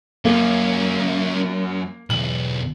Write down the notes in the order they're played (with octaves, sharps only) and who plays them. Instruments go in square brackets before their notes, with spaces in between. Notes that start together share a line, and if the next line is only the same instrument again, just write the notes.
[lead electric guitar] F#2 [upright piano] A#3 [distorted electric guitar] C#4 F4
[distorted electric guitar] B1 E2 [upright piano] F#7